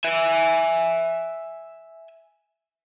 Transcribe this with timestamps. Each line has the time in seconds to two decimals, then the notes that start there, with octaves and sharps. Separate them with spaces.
0.04 E5 G#5